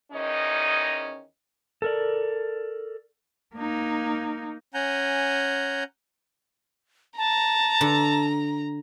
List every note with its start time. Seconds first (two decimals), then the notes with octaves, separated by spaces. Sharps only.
0.13 E2 D#3 C#4 D#4 D#5
1.82 A4 A#4 D5
3.55 A#3 D#4
4.74 C#4 F#5 G#5 A#5 G6
7.18 A5 A#5
7.81 D3